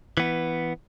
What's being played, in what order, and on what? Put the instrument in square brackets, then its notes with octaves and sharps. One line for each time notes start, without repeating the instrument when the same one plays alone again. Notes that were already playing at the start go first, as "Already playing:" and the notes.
[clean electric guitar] E3 B3